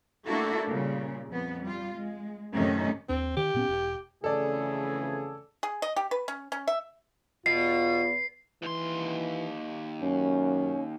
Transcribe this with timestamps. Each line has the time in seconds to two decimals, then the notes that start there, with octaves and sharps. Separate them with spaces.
0.26 A3 A#3 D4 E4 F#4 A4
0.67 A#2 C#3 G3
1.28 F2 B3
1.62 G3 F4
1.96 G#3
2.53 F#2 A2 C3 D#3 C#4 D#4
3.09 D#2 C4 D4
3.37 D#3 G4
3.54 A#2 B3 C#4
3.69 E1
4.24 F2 C#3 E3 A3 G#4 A4 D5
5.63 G#4
5.82 D#5
5.96 G4
6.11 B4
6.28 C#4
6.52 C#4
6.67 E5
7.46 E2 B2 F4 C7
8.62 D#2 E3 C6
10.02 F#2 C#4